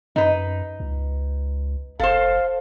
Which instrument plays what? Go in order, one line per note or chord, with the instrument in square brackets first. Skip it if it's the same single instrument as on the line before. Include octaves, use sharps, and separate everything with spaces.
[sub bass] F#2 [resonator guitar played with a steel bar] D#4 B4
[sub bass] C#2
[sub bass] F1 [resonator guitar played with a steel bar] A4 C5 [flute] F5